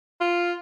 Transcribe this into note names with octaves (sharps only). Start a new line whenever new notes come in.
F4